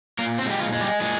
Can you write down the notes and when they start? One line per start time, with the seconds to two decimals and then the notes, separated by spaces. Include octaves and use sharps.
0.19 A#2 A#3 A#4
0.39 C4 C5
0.46 G#3 G4
0.59 F3 F4
0.73 G#3
0.81 G3 G4
1.00 A#2 G#3 G#4